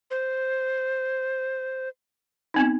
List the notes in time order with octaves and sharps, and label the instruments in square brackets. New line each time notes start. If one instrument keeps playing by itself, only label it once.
[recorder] C5
[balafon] B3 C4 D#4